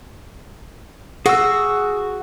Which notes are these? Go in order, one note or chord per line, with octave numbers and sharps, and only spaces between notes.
F#4 G#4 E6